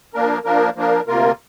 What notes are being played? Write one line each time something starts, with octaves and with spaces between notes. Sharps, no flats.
F3 A#3 D4 A#4
F3 A#3 D4 A#4
F3 A#3 D4 A#4
D2 C3 A#3 F4 A#4